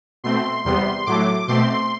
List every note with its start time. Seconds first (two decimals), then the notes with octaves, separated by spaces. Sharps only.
0.24 B2 A3 C4 C6
0.65 E2 C3 G3 B3 C6
1.06 A2 F#3 A3 D6
1.48 B2 A3 C4 C6